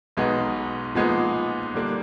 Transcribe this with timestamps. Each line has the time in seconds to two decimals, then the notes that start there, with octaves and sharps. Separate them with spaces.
0.17 B1 B2 G#3 B3 D#4
0.95 A#2 F3 G#3 B3 D#4
1.74 D3 G3 A#3 D4